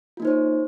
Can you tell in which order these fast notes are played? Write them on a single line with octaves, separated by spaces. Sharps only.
F4 A#3 D#4 C5 C#5